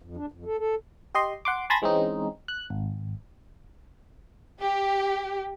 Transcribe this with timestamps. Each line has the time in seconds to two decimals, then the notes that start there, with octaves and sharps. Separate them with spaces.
0.02 F2
0.17 D4
0.32 F2
0.45 A4
0.59 A4
1.15 G4 D#5 C6
1.45 F#5 C6 D6
1.70 G#5 A5 B5 C6 G#6 A#6
1.82 E3 G#3 C4 C#4 D#4
2.48 F#6
2.70 G#1
4.60 G4